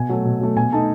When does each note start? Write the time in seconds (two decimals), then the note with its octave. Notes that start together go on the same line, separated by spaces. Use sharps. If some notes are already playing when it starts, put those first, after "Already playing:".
Already playing: B2 G#5
0.09 F#3 A3
0.25 B2
0.41 F#3 A3
0.57 B2 G#5
0.72 A3 D#4 A5